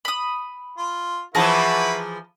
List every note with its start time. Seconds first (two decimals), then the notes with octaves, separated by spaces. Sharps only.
0.05 B5 D#6
0.78 F4
1.35 E3 F3 E4 F#4 G#4 B4 A5 A#5